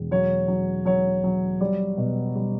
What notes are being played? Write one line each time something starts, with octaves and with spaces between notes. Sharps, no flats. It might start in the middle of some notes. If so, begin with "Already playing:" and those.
Already playing: E1
F#3 C#5
F#3
F#3 C#5
F#3
G3 D5
B2
G3